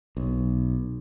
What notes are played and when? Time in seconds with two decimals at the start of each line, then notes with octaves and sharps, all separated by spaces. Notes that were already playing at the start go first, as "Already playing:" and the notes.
0.17 B1